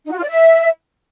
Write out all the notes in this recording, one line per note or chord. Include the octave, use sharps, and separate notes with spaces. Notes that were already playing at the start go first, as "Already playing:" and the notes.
D#4
F#4
F4
D5
E5